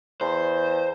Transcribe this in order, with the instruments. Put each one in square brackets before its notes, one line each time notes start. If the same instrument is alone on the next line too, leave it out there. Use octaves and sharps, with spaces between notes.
[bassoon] E2 [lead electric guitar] C5